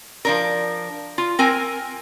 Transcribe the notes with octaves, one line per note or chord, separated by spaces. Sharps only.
F3 D4 A#4
F4
C4 A#4 G#5